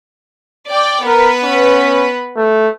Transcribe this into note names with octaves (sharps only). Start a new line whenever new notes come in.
D5 G5
B3 A#4 B4
C#4
A3